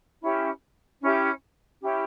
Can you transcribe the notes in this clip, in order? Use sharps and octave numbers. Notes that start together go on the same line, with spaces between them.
C#4 E4 G4
C#4 E4 G4
C#4 E4 G4